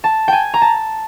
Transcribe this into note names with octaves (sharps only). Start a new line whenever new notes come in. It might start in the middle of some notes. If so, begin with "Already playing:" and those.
A5
G5 G#5
A#5
A5